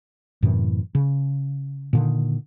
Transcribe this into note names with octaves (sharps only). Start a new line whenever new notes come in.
F#2 A2 C3 E3
C#3
A#2 D3 D#3